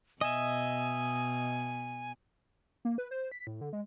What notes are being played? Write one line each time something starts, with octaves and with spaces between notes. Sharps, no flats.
B2 D#5 E5 G#5
A#3
B4
C5
B6
A2
D3
G#3